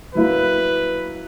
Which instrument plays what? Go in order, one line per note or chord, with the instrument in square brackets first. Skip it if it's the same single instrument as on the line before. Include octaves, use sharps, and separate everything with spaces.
[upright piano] F#3 A#3 E4 [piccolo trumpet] B4